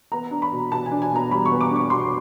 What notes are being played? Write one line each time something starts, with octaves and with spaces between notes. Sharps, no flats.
B3 A#5
D4
B5
B2
B2 A5
G#5
D4
G#5
B2 A#5
G3 B5
C#6
B3
D6
D4
C#6
B2 C6